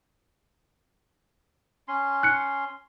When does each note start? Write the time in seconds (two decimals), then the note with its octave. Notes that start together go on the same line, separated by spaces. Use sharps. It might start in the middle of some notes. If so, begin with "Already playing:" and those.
1.88 C#4 C6
2.23 F#6 C#7